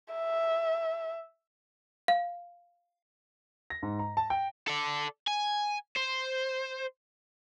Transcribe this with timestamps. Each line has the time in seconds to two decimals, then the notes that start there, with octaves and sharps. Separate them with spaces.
0.13 E5
2.08 F5
3.70 A#6
3.83 G#2
3.99 A#5
4.17 A5
4.30 G5
4.68 A4 D5
5.27 G#5
5.97 C5